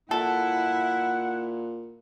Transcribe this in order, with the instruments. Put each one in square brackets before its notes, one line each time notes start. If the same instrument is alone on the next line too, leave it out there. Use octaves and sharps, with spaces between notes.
[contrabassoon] A#2 [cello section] E4 [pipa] A4 [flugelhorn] F#5